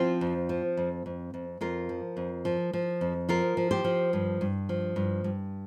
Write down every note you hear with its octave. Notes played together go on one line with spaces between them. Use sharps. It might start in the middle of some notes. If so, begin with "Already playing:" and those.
Already playing: F3 C4 F4
F2
F3
F2
F2
F2
F2 F4 A#4
F3
F2
F3
F3
F2
F3 F4 A#4
F3
G4 C5
F3
G2
G2
F3
G2
G2